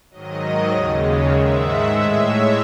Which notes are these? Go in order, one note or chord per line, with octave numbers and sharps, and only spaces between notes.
G#2 D#3 F#3 D#5
D#2 C#3 G#3
C#5
G#2 D#3 G#3 E5
F#5
A2 G#3 E5
C#5